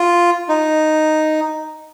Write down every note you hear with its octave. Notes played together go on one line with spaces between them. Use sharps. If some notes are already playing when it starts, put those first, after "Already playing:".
Already playing: F4
D#4